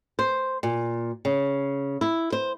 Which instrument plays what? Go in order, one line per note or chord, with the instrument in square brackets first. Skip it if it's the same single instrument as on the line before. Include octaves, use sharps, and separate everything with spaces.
[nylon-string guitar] C5
A#2
C#3
E4
C5